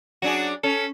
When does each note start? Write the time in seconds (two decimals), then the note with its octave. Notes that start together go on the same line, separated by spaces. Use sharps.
0.22 F#3 D4 F#4 G#4
0.63 C#4 A4